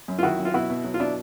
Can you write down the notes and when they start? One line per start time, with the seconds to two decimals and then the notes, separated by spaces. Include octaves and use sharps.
0.08 F#2
0.19 F4
0.23 D#3 E4 F#4
0.39 F#2
0.45 F4
0.54 B2 E4 F#4
0.70 B2
0.84 F#3
0.94 F4
1.00 B2 D4 E4